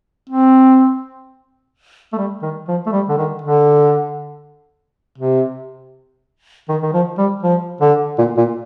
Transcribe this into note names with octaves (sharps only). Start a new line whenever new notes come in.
C4
A3
G3
D#3
F3
A3
G3
D3
D#3
D3
C3
D#3
D#3
F3
G3
F3
D3
A#2
A#2